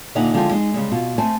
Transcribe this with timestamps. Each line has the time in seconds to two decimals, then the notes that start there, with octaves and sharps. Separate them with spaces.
0.15 A#2 D3 D#4 E5 F#5 G#5
0.34 D3 F3 G#3 E4 G5 G#5
0.51 G#3 D#4
0.74 C#3 G3 G#3
0.91 B2 F4
1.18 A3 C4 G#5 A5